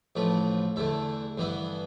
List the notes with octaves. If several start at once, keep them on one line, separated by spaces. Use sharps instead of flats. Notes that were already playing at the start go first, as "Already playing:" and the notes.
A1 A2 F3 A3 B4
E2 D3 A3 E4
G2 E3 B3 E4